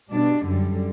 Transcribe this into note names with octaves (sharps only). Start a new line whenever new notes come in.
B2 G3 D4
F#2 D3 G3